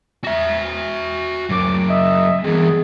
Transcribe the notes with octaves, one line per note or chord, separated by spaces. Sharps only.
F#4 E5
D2 C#3 F#3 D6
D#5 E5
C3 E3 B3 G#4